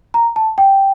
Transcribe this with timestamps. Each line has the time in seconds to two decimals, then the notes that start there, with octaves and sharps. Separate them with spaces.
0.14 A#5
0.36 A5
0.58 G5